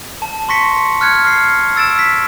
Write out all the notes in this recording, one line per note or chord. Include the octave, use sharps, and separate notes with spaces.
A5
C6 C#6 A#6 B6 C#7
F6 F#6 G#6 C#7
F6 C7
E6 A6 D7 E7
B6